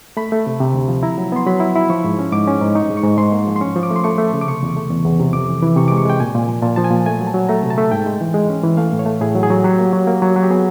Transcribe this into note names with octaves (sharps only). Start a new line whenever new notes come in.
A3 B5
A3
C3
C3
D2
F3
E4 A#5
F#3
B3 C6
F#3 B5
E4
E4
F3 C#6
G#2
C#4
G#2 D6
C#4
G#2
D#4 C#6
G#2
C#6
G#2
G#2 C6
A#3
F3
C6
C#4 C#6
F3
D6
A3
C6
A3 C#6
A3
C#3
D6
C3 C#6
E2
A3
E2
E2
C3
F2 D6
E3
E3
C3 C#6
D6
G#3
C#6
G#3 G5
A#2 G#5
A#2
F3
A#2 A5
F3 A5
G#5
A#2
A3 G#5
F#3
A5
F#3
A3 A#5
C3
A5
A3
G#2 G5
G#3
E3
G#3
C#4
E3
A3 F5
A2
C#5
A3
A2 G#4
F#3
G#4
F#3
F#3 G4
A#3
F#3
A#3
F#3
F#3
G4
B3 G#4